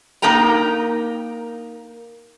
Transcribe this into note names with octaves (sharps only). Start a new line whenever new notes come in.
A#3 D#4 A#4 G5 A#5